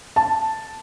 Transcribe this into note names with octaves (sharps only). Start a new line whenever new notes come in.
A5